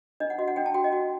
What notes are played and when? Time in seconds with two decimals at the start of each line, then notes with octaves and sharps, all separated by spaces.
0.20 D4 D#5
0.30 F#5
0.38 F#4 D#5
0.48 F#5
0.56 D4 G5
0.66 A5
0.74 F#4 G5
0.84 D#5
0.92 F#4